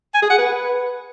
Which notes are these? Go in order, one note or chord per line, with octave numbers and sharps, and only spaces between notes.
G#5
G#4
F#5
B4